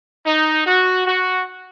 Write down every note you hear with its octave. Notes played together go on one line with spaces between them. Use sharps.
D#4
F#4
F#4